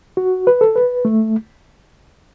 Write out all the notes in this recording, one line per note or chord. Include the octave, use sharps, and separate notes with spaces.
F#4
B4
A4
B4
A3